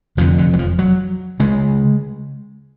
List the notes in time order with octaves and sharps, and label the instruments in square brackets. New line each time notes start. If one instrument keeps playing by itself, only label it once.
[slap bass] F1 F2 D3 F3
D3
F#3
F3
F#3
C#3 G#3